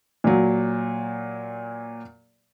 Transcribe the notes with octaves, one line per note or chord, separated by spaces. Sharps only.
A#2 F#3